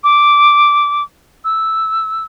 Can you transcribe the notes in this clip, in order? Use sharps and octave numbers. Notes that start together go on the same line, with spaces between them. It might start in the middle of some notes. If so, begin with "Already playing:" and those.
D6
E6